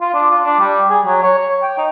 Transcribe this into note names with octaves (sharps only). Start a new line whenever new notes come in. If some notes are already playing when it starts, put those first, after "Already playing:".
F4
D4
F4
D4
G3
G#4
F#3
C#5
C#5
G5
D#4